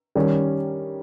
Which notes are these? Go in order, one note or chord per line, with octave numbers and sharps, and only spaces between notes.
D#3 G3 C#4